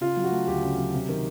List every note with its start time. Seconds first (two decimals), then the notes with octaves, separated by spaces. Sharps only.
0.01 C#3 F4
0.17 F#3
0.24 F#4
0.32 A3
0.46 D2 G4
0.62 C#3
0.78 F#3
0.94 C3
1.09 D#3